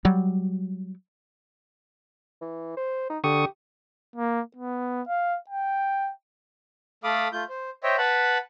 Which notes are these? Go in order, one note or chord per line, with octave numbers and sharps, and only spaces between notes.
F#3 G3
E3
C5
D#4
D3 G4 C#6 D#6
A#3
B3
F5
G5
A3 A4 F5 B5 D6 D#6
A3 F4 G6
C5
C5 C#5 D#5 E5 G5
B4 F#5 A5 B5